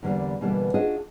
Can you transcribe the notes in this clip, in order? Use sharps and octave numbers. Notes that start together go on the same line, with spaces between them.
E2 D3 G3 A#3
B2 D3 E3 G3 A#3 B3
D4 F4 F#4 G#4 D#5